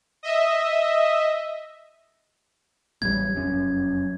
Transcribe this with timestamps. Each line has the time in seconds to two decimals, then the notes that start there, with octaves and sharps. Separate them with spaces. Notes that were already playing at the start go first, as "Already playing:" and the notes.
0.23 D#5 E5
3.02 A1 F#3 G3 G#6
3.35 F1 F#2 C#4